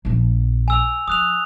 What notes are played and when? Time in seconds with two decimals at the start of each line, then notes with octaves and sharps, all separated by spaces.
0.05 A#1 F3
0.68 G#5 E6 F7
1.08 F3 D#6 F#6 F7